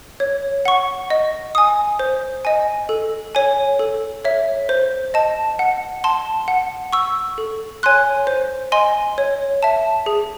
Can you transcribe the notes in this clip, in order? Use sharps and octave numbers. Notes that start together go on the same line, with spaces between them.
C#5
F#5 C#6
D#5
G#5 D#6
C5
D#5 G#5
A4
C#5 G#5
A4
C#5 E5
C5
D#5 A5
F#5
A5 C6
F#5
C#6 E6
A4
C#5 G#5 C6 F#6
C5
D#5 G#5 C6
C#5
E5 A5
G#4